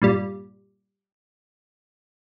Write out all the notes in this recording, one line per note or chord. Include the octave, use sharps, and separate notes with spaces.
G2 A#2 G3